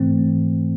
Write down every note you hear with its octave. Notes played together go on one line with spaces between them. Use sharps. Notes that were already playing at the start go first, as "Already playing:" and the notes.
Already playing: G#2 E3 A3 C4